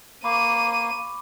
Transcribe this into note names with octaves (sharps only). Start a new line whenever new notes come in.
A#3 B5 C#6 D6 D#7